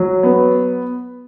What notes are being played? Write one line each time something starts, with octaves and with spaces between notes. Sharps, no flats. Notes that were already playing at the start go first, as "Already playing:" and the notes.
Already playing: F#3
B3